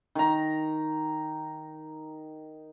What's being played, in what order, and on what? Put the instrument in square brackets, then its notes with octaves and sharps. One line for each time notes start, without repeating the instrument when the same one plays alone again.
[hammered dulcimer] D#3 A#5